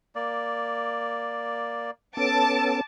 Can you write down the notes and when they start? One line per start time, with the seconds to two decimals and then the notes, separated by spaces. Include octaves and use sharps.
0.15 A#3 D5
2.17 B3 C#4 A4 A5 D6